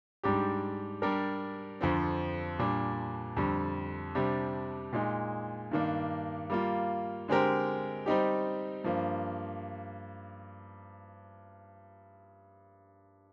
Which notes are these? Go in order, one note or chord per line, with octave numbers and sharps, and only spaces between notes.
G#2 G3 D4 G4
G3 D4 G4 A#4
F2 D3 F3 C4
A#2 G3 D4
F2 D3 G3
C3 G3 D4 G4
A#2 G#3 D#4
G2 D#3 A#3 D4
G3 A#3 F4
D3 G#3 C4 G4 A#4
G3 C4 D#4 G4
G2 F3 A#3